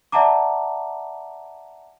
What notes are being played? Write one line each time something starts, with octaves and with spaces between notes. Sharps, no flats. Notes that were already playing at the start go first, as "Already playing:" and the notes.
D5 E5 F#5 A5 A#5 D6